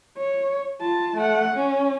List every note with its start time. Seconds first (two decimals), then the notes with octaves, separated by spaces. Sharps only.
0.17 C#5
0.81 F4 A5
1.17 A3 F#5
1.56 C#4